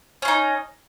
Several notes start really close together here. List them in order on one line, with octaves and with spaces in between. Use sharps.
C#4 F4 D#4